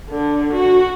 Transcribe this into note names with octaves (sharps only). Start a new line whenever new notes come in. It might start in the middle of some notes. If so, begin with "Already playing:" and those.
D3
F#4